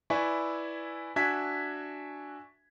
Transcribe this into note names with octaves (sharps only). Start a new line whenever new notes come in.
E4 B4 D5 E5 G#5 C#6
D4 F#4 E5 G#5 G#6 B6